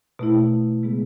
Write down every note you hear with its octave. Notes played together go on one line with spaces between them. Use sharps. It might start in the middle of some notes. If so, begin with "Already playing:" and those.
B2 A3 E4
C#3 G#3 B3 E4 G#4